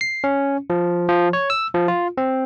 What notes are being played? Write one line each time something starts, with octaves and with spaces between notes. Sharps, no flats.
C7
C#4
F3
F3
C#5
E6
F3
F4
C4